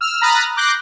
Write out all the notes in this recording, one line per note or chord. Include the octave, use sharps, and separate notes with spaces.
E6 F6
A#5 B5 D#6 F6 F#6 A6
D6 F#6 G6 A#6 C7